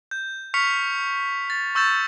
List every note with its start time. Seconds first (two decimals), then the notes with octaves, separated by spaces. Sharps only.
0.11 G6
0.54 C#6 F6 B6 C#7 F7
1.50 A6
1.75 C#6 E6 G6 A6 E7